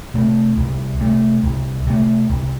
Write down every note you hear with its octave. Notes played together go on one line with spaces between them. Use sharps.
C3 A3
C2
C3 A3
C2
C3 A3
C2